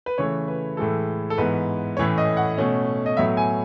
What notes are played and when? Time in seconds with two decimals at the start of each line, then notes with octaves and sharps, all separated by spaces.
0.06 B4
0.18 C#3 E3 A3 C#5
0.48 B4
0.77 A2 E3 G#3 A4
1.30 A4
1.38 G#2 E3 B3 B4
1.97 A2 E3 A3 C#4 C#5
2.18 D#5
2.37 F#5
2.58 B2 A3 C#4
3.06 D#5
3.17 A2 F#3 B3 E5
3.37 G#5